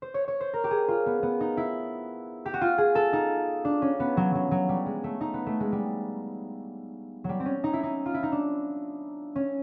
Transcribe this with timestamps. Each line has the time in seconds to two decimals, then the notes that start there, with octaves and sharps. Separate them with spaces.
0.02 C5
0.14 C#5
0.28 C#5
0.41 C5
0.54 A#4
0.64 G4
0.71 G#4
0.88 F4
1.06 B3
1.23 B3
1.40 D#4
1.57 E4
2.45 G4
2.54 F#4
2.61 F4
2.78 G#4
2.95 A4
3.13 D#4
3.65 D4
3.82 C#4
4.00 B3
4.17 F#3
4.35 F#3
4.51 F#3
4.69 G3
4.86 G#3
5.04 A3
5.21 D#4
5.34 B3
5.46 A3
5.60 G#3
5.72 G3
7.24 F#3 G3
7.40 C4
7.46 C#4
7.64 D#4
7.73 E4
7.83 D#4
8.06 F4
8.14 E4
8.23 D#4
8.32 D4
9.36 C#4